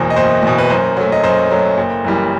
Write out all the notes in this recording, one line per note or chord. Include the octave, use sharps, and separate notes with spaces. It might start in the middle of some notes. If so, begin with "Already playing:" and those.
Already playing: F#1 E2 B2 C5
D#5
F#1 C5
E2 B2
B4
F#2 C5
F#3 A3
D#5
F#2 C5
F#3 A3
F#1
F#2 E3 G3